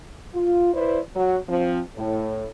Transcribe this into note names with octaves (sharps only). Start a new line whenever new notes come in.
F4
E4 B4 C5 D5
F#3
F3 C4
A2